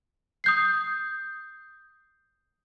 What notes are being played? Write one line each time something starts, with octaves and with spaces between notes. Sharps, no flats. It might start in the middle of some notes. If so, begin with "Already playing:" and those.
D#6 G6 C7